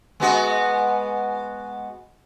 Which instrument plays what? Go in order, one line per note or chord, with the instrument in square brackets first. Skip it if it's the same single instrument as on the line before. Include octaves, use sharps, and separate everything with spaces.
[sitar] G#3 B3 F#4